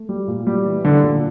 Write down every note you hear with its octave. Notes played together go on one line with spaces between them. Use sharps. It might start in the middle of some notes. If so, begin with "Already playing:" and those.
Already playing: A3
G3
A#2
G3
E3
D3 G3
A#2